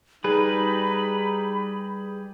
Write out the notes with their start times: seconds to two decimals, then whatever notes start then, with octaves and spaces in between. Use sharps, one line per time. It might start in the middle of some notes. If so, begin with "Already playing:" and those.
0.24 G3 D#4 G#4 B4 B5